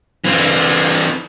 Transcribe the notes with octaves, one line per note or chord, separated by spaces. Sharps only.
E3 C4